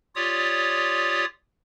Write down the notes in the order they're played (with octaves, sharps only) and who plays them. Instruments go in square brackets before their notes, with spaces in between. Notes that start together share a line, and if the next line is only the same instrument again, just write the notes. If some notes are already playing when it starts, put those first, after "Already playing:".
[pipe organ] F4 G4 C#5 D5 D#6